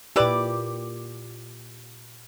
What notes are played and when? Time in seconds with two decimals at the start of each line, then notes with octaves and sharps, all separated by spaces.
0.16 A#2 E4 G4 B4 D5